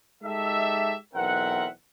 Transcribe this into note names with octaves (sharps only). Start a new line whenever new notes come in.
G#3 D#4 G4 A4 E5
B1 E2 C4 A#4 E5 F#5